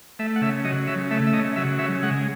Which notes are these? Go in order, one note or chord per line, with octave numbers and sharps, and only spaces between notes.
A3 E5
F#5
C#3 E5
F#3 D#5
C#3 E5
A3 E5
E5
C#3 D#5
F#3 E5
C#3 E5
G#3 F#5